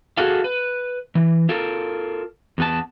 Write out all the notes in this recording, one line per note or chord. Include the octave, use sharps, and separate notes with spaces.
F#4 G#4 A4 F5
B4
E3
F4 A4 A#4
E2 B3 A5